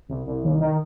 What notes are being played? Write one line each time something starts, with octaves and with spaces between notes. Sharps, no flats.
C2
C2
D#2
D#3